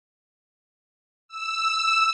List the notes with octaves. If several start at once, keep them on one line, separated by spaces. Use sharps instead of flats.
E6